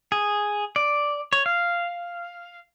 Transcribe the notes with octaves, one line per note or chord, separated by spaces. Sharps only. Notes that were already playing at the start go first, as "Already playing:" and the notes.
G#4
D5
C#5
F5